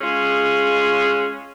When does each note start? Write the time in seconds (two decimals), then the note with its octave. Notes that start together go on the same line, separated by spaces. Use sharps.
0.01 G#3 C#4 F4 G#4